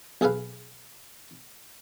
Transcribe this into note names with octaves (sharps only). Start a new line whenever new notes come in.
B1 G#4 A4 B4 F5